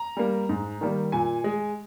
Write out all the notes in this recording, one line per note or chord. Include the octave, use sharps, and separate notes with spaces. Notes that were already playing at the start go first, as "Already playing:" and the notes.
Already playing: A#5
G3 A#3
G#2
D#3 G3 A#3
A#2 G#5
G#3